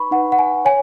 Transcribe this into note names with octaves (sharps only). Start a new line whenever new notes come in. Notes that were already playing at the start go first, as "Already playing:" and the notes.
Already playing: D#4 B4 B5 C#6
D#4 B4 F#5
F#5
G#5
C#5 G#5